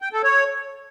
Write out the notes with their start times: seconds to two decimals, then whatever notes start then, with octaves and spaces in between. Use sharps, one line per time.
0.02 G5
0.13 A4
0.24 C#5